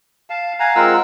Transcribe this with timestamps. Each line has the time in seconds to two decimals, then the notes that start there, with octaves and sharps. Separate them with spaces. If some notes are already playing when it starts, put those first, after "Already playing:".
0.30 F5 A5
0.60 F5 F#5 G#5 A#5
0.76 G#3 C4 F4 A#4 F#5 E6